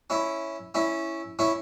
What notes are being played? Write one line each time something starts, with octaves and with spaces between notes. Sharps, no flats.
C#4 E4
C#4 E4
C#4 E4